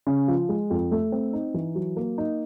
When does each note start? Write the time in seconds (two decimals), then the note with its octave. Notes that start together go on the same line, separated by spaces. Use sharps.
0.07 C#3
0.28 F3
0.49 G#3
0.70 F2
0.91 A3
1.12 C4
1.33 D#4
1.54 E3
1.75 F#3
1.96 A#3
2.18 D#4